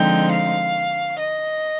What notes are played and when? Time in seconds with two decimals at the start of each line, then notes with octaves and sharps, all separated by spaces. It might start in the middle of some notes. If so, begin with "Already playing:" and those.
Already playing: D3 F3 G#3 C4 D#4 G5
0.31 F5
1.19 D#5